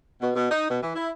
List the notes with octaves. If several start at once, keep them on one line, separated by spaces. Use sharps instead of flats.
B2
B2
D#4
B2
E3
E4